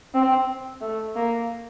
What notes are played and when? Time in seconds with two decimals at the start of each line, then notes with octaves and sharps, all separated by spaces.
0.14 C4
0.82 A3
1.16 A#3